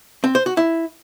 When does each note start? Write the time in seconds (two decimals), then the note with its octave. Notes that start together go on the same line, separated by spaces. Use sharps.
0.24 C4
0.35 C5
0.46 F#4
0.57 E4